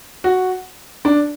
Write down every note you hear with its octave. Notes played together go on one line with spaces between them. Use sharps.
F#4
D4